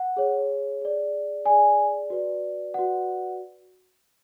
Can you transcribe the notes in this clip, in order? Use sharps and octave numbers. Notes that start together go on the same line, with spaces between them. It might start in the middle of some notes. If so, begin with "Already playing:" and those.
Already playing: F#5
G#4 C#5
G#4 D5
G#4 D5 G#5
F#4 B4 D5
F#4 B4 D5 F#5